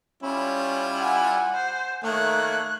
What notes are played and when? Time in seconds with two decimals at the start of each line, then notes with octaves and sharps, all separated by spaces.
0.23 G3 C#4 E4 F4
1.01 F#5 G#5
1.54 C5
2.04 D#3 A3 A#3 C#5 F#6